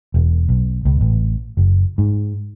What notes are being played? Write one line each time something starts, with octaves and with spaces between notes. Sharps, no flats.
E1
B1
C#2
A1
F#1
G#2